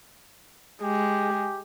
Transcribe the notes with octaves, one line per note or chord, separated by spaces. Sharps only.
G#3 G4